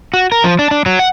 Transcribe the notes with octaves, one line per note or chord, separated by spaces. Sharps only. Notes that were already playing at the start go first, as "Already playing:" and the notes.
F#4
A#4
F3
D4
D4
F#3
F#5